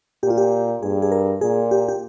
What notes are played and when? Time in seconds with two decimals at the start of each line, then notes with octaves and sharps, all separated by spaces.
0.23 A#2 G4
0.30 F4
0.37 G4
0.82 G2 G#4
1.02 G#4
1.12 A#4
1.41 A#2 G#4
1.71 G4
1.89 G4